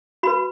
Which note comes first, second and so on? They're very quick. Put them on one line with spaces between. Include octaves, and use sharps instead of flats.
F#4 B5 B4